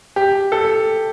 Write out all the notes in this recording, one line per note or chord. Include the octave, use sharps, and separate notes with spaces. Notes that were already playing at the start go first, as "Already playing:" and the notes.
G4
A4